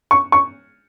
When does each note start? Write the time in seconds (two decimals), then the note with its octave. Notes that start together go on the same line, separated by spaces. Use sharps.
0.11 C#6
0.32 C#6